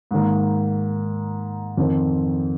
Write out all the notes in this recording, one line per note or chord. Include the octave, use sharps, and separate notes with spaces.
G#2 D#3 A#3
F2 D#3 C4